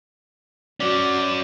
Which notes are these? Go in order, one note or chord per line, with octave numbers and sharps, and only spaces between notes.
F#3 C#4 D5